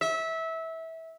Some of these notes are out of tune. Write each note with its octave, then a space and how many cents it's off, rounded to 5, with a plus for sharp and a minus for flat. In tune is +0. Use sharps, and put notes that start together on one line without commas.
E5 -20